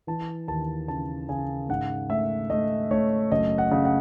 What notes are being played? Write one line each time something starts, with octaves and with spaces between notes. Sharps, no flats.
E3 A5
D#2 A5
C#3 A5
C#3 G#5
G#2 F#5
A3 E5
A3 D#5
A3 C#5
F#1 D#5
F#5
C#3
F#5